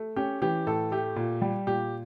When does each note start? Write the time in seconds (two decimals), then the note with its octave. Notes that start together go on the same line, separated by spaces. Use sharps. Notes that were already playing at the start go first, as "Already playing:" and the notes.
Already playing: A3
0.16 C#4 G4
0.42 E3 G4
0.67 A2 A4
0.92 A3 G4
1.16 A#2
1.42 G3
1.67 A#2 G4